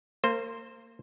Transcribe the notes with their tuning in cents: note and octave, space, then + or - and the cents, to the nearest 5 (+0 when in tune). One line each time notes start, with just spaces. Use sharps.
A#3 -30 C5 +0